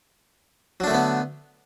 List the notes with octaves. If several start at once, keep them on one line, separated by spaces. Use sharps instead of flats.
D3 F#3 A3 B3 D4